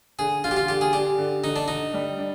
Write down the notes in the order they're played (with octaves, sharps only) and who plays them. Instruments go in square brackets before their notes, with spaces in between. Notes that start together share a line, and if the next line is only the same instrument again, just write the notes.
[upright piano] D3 [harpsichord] G#4
[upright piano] D3 [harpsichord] F4
[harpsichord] G4
F4
[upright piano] D3 [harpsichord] G4
[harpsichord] G#4
[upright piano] D4 [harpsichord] G4
[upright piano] D3
[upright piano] D3 [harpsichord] D#4
[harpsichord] D4
[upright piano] D3 [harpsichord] D#4
[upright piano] G3
D4